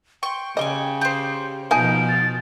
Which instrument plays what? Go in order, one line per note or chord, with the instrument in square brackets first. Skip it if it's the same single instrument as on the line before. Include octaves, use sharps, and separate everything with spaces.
[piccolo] G5 [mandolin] C6 C#6
[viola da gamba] C#3 [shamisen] G3 D#5 [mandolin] G#5 C6 D6
[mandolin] G4 C5
[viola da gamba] B2 F3 [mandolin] D#4 [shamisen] D#5 G#5 A5 [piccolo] D7
[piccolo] A6